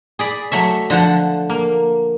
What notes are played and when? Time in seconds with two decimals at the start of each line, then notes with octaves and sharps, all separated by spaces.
0.19 G#4 D5 B5
0.52 F#3 A3 C#5 E5
0.90 D3 F3 F#5 A5
1.50 A#3